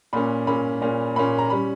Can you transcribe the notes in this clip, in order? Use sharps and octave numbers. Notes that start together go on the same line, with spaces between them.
A#2 A#3 C#4 B5
A#2 A#3 C#4 B5
A#2 A#3 C#4
A#2 A#3 C#4 B5
A#5
G3 C#4 B5